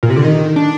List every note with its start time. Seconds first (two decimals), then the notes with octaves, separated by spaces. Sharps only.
0.03 A#2
0.10 C3
0.17 D3
0.24 D#3
0.56 D4